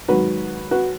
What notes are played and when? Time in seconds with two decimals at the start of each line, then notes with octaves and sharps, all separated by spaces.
0.08 G#2 D#3 F#3 F#4 B4
0.71 F#4 B4